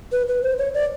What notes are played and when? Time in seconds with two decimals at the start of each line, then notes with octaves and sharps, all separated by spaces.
0.12 B4
0.28 B4
0.43 C5
0.58 C#5
0.74 D5